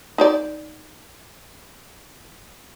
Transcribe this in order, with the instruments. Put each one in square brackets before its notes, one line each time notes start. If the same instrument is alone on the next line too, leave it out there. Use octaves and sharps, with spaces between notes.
[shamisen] D#4 C5 D5